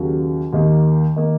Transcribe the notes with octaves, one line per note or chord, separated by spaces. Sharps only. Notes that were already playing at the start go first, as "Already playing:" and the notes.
Already playing: D#2 C#3 F#3
D#2 D#3 A#3
D#3 A#3